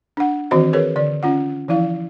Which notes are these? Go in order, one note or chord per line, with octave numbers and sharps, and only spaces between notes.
D4 F#5
D#3 E3 C4 F#4 C5 D#5
G#4 A#4 B4 C#5
D3 D5
C#4 F4 F#5
E3 F3 E4 F5